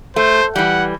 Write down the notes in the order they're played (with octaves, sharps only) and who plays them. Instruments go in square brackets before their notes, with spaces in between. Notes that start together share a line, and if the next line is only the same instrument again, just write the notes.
[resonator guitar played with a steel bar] A3 [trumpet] C5
[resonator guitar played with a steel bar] E3 G3 [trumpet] F#5